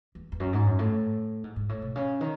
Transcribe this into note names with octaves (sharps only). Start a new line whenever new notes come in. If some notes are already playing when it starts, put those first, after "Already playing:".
E2
E2
F#2
G#2
F#2
A2
G#2
G#2
A2
B2
C#3
D#3